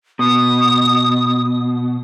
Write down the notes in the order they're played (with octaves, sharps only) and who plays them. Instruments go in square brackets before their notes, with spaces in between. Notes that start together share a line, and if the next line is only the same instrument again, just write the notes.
[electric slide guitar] B2 [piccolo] D#6